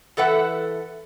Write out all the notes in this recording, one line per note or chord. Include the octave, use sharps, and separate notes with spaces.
E3 A4 B4 E5 F#5